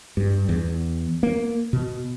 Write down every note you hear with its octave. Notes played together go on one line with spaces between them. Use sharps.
G2
E2
A#3
B2